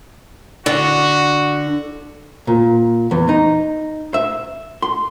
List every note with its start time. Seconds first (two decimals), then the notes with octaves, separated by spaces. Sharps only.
0.66 D3 F#4
2.47 A#2
3.11 E2
3.29 D#4
4.14 E5
4.82 C6